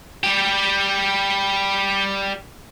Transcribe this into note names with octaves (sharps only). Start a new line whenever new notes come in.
G3 G4